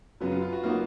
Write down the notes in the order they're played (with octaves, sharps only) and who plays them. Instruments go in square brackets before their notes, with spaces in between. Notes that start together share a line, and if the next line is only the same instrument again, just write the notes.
[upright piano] F#2 C#3 F#3 [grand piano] B3
[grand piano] F4
F4
F#4
[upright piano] F#3 A#3 D#4 F#4 [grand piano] F4